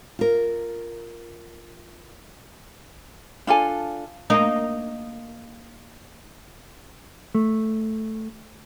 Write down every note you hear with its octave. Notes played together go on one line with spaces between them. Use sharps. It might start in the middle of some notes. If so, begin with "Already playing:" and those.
F4 A#4
D4 F4 A4 G#5
A#3 D#4
A3